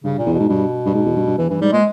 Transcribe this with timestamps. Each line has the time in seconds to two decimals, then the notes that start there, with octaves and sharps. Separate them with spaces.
0.04 G2 C#3
0.19 A#2
0.26 E2
0.34 B2
0.39 G#2
0.49 G2 B2
0.86 G2
0.94 G#2
1.06 E2
1.16 G2
1.27 G2
1.38 E2 E3
1.50 G2 E3
1.61 G#2 G3
1.72 A#2 G#3